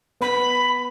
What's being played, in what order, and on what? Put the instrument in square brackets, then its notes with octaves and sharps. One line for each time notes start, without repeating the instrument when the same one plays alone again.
[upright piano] B3 [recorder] B5